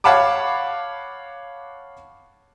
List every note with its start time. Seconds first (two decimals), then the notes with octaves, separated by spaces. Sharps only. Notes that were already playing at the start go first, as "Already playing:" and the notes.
0.04 C#5 F5 F#5 A5 B5 D6